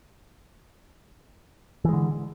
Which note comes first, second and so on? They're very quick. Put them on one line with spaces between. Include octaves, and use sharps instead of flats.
E3 G#3 D3